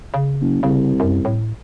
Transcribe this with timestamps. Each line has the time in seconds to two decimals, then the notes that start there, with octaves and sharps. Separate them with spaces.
0.14 C#3
0.41 F#1
0.63 C2 C#3
1.00 F#2
1.25 A2